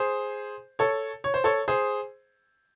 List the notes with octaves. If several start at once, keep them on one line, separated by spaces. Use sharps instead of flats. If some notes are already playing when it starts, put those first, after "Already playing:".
Already playing: G#4 C5
A4 C#5
C#5
C5
A4 C#5
G#4 C5